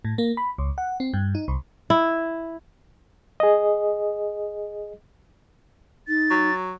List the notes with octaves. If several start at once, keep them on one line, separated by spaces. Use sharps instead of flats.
A2
A#3
B5
C#2
F#5
C4
G2
D#4
C2
E4
G#4 D#5
D#4 A6
F#3